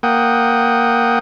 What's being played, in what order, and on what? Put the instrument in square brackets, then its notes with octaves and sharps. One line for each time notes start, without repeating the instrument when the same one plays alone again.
[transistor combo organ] A#3 F#5 G5 D#6